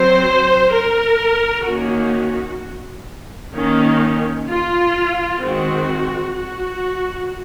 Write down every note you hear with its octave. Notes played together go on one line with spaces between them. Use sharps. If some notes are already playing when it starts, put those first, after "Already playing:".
Already playing: F#3 C4 C5
A#4
D#3 A#3 C#4 F#4
D#3 A#3 C#4
F4
D#3 G#3 C4 F#4
F#4